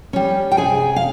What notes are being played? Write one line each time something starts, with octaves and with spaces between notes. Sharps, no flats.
G3 C#4
G5
C3 G#4 G#5
F5